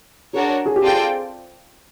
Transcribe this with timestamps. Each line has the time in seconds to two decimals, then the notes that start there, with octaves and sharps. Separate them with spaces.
0.33 D4 F#4 G#4 A#4 C#5
0.66 G#4
0.76 G4
0.82 C4 F4 G#4 A4 D5 G5